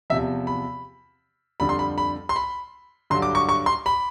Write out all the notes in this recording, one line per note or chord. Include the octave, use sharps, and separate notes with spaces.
E2 C3 F3 E5
B5
F2 D3 G3 B5
C6
B5
B5
C6
B5
G2 D3 F#3 C6
D6
C#6
C#6
C6
B5